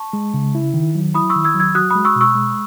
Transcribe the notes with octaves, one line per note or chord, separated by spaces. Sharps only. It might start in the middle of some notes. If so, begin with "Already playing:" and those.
Already playing: A5 C#6
G#3
C#3
E4
D#3
F#3
E4 B5 D#6
C#6 E6
D#3
E6 G#6
F#3
E6 G#6
F#4 D#6 F#6
B5 D#6
G#3
C#6 E6
B2
C#6 E6
G#3